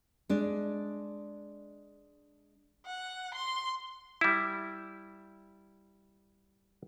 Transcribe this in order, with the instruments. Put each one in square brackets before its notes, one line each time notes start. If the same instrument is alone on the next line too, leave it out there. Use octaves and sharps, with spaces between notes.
[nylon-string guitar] G#3 D4
[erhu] F#5
C6
[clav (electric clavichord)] G3 E4